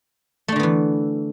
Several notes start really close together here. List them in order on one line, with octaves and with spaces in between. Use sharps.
A3 D4 D3 B3 E3